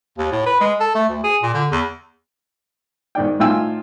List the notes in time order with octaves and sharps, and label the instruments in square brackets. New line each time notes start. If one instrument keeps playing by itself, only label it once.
[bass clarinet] D#2
A2
B4
G#3
A4
A3
D2
G#4
A#2
D3
E2
[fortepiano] G#2 D#3 D5 G5
A2 D#3 F4 G5 G#5 E6